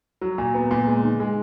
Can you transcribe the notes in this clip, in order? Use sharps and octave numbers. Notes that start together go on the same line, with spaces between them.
F#3
A#2
B3
A#2
G#3
D#3
G#3